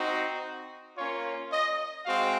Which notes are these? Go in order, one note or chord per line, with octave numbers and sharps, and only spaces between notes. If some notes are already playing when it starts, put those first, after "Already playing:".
Already playing: C4 D#4 F#4
A#3 C#4 F4 C#5
D#5
G#3 C4 F#4 F5